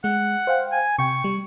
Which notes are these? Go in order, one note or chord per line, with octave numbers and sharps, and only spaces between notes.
G#3 F#5
C5 F5 G5
G#5
C3 G5 C#6
G3